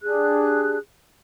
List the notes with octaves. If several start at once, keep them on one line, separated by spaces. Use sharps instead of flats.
D4 G4 G#4 F#6